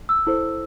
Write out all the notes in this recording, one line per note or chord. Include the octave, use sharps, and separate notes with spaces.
E6
E4 A4 C5